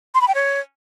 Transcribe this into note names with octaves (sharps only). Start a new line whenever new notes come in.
C6
B5
G5
C#5